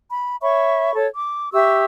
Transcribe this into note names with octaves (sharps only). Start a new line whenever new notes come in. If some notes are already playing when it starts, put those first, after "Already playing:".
B5
C#5 E5 B5 C#6
A4 C#5
D6
G4 E5 C#6 E6